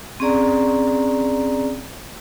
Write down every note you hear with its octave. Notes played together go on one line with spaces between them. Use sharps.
C4 C#4 G#4 D5 A#5